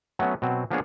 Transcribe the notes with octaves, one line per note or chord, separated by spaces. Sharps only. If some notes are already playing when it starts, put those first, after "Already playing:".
F#3 A3 B3 C#4
B2 F#3 C4
F3 A#3 B3 D4 G#4 C#5